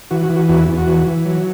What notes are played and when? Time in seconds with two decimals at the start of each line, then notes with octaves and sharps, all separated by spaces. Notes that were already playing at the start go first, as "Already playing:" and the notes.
0.11 E3 F#4
0.23 F#4
0.29 E3
0.36 F#4
0.49 E2 F#4
0.59 E4
0.68 E2
0.78 F#4
0.87 E3
1.07 E3
1.25 F#3